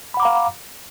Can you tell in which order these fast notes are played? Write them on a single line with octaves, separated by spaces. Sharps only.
B5 F#5 D6 A#5 F5